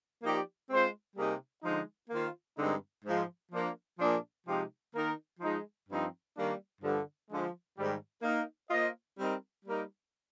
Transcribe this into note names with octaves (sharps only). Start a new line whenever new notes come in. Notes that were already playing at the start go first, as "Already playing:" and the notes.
F3 A#3 D#4 G4 D5
G#3 C4 F4 C5
C3 G3 A#3 D#4 G#4
D3 F3 G#3 D#4
D#3 A#3 F4 C5 F5
G2 D3 G#3 C4 D#4
G#2 F3 G#3
F3 A#3 D4
A#2 F3 A#3 D4 G#4
C3 F3 G#3 D#4 G4
D#3 A#3 D#4 A#4
F3 G#3 D#4
G2 F3 C4 D#4
D#3 G3 A#3 D4
G2 D3 F3
D3 F3 G#3
G#2 D#3 G3
A#3 D#4 A#4
A#3 F4 C5 D#5
G3 C4 D#4 A#4
G3 A#3 D#4 A#4